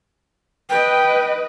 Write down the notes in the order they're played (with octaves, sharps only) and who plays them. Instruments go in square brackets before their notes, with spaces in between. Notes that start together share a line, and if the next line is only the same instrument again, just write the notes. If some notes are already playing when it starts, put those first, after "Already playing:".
[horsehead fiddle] B4 D#5 [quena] G5